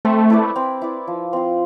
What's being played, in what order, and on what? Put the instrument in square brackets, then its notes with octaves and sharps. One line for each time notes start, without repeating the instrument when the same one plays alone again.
[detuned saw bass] A3 [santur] C4
[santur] E4 B4 D5
C4
E4 B4 D5
F3
C4 F4